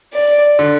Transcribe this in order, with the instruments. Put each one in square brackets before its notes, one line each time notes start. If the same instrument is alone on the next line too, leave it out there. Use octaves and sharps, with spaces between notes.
[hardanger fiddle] D5
[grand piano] D3